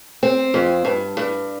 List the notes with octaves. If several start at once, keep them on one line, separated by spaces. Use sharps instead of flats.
C4
F2
G2
G2